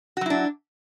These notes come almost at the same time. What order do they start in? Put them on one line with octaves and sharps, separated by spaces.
F#4 F#3 E4 D4